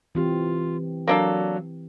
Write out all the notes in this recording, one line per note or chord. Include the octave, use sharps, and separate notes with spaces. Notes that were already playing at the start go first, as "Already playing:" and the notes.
E3 C4 F4 G4
F#3 A#3 D4 A4